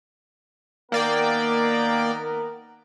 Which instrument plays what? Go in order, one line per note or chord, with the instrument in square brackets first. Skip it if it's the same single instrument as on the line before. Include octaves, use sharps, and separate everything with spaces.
[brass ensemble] D#3 B3 A#4 [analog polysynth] A#3 D5 G5